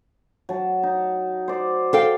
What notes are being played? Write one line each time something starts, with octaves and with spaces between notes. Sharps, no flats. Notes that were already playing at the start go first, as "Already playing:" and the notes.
F#3 A5
D#4
C5 D5
A4 F5 G5